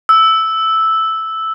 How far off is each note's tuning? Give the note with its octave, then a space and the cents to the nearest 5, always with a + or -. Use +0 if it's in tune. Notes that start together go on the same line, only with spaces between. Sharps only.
E6 -5